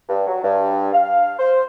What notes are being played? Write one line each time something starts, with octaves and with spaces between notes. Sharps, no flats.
G2
F#3
G2
F5
C5